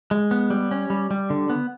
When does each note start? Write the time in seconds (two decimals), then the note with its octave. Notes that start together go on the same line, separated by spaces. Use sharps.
0.11 G#3
0.31 B3
0.50 G3
0.71 C#4
0.90 G3
1.11 G3
1.30 D3
1.50 B3